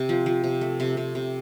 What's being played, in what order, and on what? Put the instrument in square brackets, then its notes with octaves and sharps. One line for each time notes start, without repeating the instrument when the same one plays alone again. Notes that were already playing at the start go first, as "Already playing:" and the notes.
Already playing: [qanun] C3
F3
F3
C3
A3
C3
C3
C3